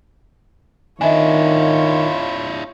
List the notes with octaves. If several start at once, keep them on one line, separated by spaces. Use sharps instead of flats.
D#3 D4 E4 F4 C#5 D#5 E5 G#5